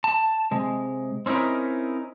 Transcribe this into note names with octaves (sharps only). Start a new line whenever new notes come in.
A5
C3 G#3
C4 C#4 D#4 E4 A#4